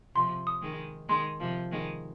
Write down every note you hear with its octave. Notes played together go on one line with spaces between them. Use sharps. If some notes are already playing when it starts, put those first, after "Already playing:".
C3 F3 C6
D#6
D#3 G#3
D#3 G#3 C6
C3 F3
D#3 G#3